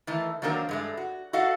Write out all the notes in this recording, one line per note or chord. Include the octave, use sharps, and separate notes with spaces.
D#3 E3 A3
D#3 F#3 A#3 C4 D4 A#4
G2 G#3 A3
F#4
F#4 A4 D#5 F5 F#5